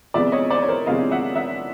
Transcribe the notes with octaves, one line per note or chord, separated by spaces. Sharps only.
C3 F3 G#3 B3 D5 E5
C#5 D#5
C5 D5
C#5
A#4 C5
C3 F3 G#3 B3 D#5 F5
E5 F#5
E5 F#5